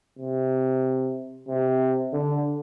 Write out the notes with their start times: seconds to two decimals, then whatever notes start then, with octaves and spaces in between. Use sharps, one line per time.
0.18 C3
1.48 C3
2.13 D3